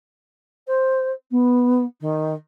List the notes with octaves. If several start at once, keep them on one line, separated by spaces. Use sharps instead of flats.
C5
B3
D#3